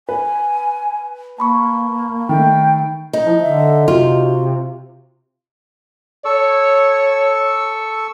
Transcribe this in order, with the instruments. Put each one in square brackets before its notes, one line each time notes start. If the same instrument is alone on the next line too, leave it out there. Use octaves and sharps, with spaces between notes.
[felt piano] B4 [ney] G#5
[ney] A#3 [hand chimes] A5 B5 C#6
[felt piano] D#3 A3 [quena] G5
[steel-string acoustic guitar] D#4
[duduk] F3 [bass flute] E4
[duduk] D3 [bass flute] E5
[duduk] C3 [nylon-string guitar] F4 [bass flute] F#4
[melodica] A4 C#6 E6 [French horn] C#5